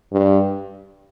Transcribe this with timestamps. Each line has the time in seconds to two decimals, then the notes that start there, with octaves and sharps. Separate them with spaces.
0.13 G2